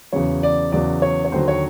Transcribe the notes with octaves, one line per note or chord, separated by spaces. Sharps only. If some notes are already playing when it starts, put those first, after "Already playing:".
E2 C#3 F#3 C#5
D5
E2 C#3 F#3 D5
C#5
C#5
D#2 D3 F#3 C5
C#5